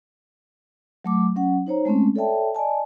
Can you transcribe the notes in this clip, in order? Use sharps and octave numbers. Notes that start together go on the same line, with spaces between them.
F#3 A3 D6
F#3 C#4 F#5
D#4 C5 C#5 A#5
G#3 A3 C4 C#4
A4 C#5 D5 E5 G5 A5
D5 D#5 G#5 A5